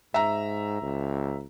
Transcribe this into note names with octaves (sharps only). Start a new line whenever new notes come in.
G#2 E5 A#5
C#2